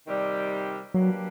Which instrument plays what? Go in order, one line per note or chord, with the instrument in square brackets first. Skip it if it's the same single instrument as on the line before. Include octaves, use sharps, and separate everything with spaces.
[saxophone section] C3 D#3 G3
[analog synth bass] F#3 [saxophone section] G3 A#3 D4 G4 B4